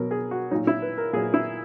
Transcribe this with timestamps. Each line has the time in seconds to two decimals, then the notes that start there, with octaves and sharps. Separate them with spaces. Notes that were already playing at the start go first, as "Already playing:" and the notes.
Already playing: B2 F#3 A#4
0.11 G#4
0.31 F#4
0.51 A#2 F#3 D#4
0.67 E4
0.82 B4
0.98 A#4
1.13 A#2 G#4
1.16 F#3
1.34 E4